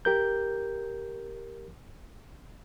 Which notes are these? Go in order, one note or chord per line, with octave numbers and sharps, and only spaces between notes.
G4 A#4 G6